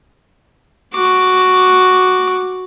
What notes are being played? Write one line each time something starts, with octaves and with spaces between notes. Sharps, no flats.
F#4 D6